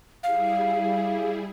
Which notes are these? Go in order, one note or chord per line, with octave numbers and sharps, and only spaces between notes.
G3 E4 G#4 F5